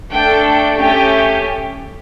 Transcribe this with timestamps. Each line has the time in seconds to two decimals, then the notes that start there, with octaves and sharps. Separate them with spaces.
0.13 A3 D4 A4 G5
0.79 A3 C#4 G4 G5